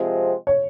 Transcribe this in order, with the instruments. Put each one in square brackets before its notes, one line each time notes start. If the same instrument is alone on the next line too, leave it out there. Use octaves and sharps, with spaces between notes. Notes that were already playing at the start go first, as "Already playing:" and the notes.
Already playing: [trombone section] C3 F3 G#3 C4
[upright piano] C#5